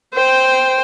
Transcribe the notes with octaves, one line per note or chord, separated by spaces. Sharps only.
C5 G5